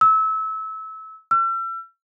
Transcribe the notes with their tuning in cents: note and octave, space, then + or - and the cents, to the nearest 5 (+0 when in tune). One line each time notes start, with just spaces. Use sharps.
E6 -25
E6 +40